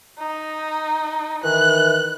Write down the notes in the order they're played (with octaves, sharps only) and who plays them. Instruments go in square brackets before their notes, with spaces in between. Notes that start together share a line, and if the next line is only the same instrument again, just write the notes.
[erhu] D#4
[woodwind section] D#3 E3 [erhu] F#6